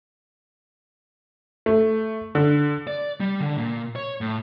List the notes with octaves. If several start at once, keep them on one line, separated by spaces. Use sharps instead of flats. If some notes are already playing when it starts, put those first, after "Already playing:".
A3
D3
D5
G3
D3
A#2
C#5
A2